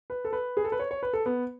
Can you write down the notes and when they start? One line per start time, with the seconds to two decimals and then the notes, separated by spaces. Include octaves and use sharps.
0.10 B4
0.25 A4
0.33 B4
0.57 G#4
0.64 A4
0.72 B4
0.80 C#5
0.91 C#5
1.03 B4
1.13 A4
1.26 B3